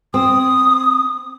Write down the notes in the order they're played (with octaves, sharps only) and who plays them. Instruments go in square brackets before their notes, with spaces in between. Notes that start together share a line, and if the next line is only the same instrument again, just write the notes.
[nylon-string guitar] C4 [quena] D#6